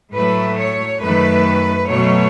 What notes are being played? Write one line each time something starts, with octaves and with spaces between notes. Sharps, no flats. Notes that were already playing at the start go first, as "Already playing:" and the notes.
A2 F#3 A3 B4
C#5
F#2 D#3 A3 B4
B2 F#3 A3 C#5